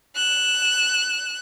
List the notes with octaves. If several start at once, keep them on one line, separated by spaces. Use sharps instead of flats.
F#6 E7